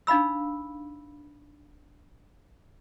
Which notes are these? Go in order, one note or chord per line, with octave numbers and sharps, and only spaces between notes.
D4 D#4 F5 B5 E6